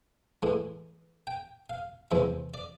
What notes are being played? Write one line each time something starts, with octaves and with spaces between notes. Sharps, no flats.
A2 E3 G#3
G5
F5
E2 C3 E3 G#3 E5
D5